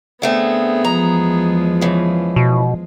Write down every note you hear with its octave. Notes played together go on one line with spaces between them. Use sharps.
D3 A3 B3 C4 G#4
E2 F3 G#3 A#5
C#3 E3
B2